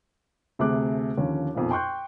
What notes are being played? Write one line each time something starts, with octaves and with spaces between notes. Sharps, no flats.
D2 C3 A3 G#4 D6 F#6
D#2 D3 F3 C#4
B1 F2 A#2 F3
G5 C6 C#6 F#6 G6